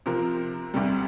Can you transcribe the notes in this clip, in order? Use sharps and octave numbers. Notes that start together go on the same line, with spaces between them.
C3 F3 C4 A#4
D2 C3 G3